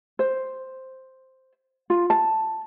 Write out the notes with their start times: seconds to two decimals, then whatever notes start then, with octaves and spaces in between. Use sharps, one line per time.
0.19 C5
1.90 F4
2.10 A5